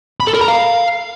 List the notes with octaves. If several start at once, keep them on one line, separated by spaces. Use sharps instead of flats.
B5
A4
A#4
A#5
F5